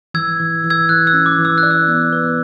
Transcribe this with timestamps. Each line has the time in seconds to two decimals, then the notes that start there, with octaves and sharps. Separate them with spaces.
0.14 E3 E6 G#6
0.40 E3
0.64 E3
0.70 E6 G#6
0.89 E3 F#6
1.07 E6
1.13 C#4
1.26 D6
1.39 E3
1.45 E6
1.58 F#6
1.63 D5
1.71 E6
1.88 B3
2.13 B4